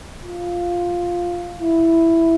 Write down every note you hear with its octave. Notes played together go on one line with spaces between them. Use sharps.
F4
E4